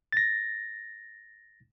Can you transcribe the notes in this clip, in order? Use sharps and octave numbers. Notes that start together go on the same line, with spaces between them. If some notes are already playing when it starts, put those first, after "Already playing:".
A6 A#6